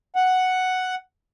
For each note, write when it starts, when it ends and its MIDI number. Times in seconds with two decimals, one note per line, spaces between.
0.16 0.95 78